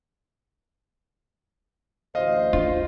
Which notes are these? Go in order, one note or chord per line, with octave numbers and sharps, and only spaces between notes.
A1 D2 C5 D#5 F5
D4 F4